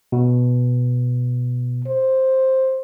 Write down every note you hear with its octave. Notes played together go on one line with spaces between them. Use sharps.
B2
C5